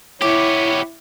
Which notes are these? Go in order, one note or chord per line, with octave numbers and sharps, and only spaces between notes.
B3 E4 G4 C#5 D6